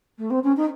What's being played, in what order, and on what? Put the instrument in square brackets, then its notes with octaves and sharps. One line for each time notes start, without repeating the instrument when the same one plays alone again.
[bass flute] A3
C4
C#4
D#4